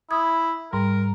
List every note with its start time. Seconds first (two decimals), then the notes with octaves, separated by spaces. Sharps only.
0.11 E4 D#6 G#6
0.73 G#2 G3 A#4